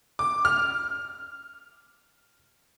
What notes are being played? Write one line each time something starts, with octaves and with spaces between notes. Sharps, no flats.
D6
F6